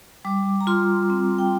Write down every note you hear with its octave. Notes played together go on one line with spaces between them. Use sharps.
G3 D6
A#5
F4 C6
C4
G5